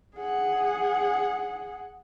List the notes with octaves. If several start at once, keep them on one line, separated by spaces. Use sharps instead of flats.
G#4 F#5